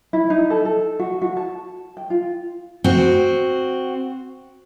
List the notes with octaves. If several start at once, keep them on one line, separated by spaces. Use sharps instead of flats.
E4
D#4
A4
A4
F#4
F#4
A5
G5
F4
C4 F#4